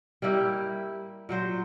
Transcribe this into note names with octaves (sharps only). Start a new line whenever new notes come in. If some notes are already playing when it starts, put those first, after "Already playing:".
G3 A#3 E4 G4
A#2 F#3 C5